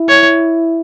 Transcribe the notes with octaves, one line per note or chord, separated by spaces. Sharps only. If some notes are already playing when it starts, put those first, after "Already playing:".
Already playing: E4
C#5